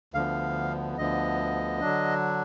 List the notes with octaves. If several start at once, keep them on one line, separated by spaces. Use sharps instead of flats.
D2 D3 F3 B3 F5
D2 D3 F3 B3 D#5
D3 F#3 D4